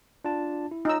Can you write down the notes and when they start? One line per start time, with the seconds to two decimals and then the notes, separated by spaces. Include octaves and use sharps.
0.25 D4 F4 A5
0.71 E4
0.85 D#4 F4 C#5 E6